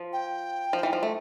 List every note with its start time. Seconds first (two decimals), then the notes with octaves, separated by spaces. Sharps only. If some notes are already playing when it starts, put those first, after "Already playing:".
Already playing: F3
0.13 G5
0.73 F3
0.83 E3
0.93 F3
1.03 A3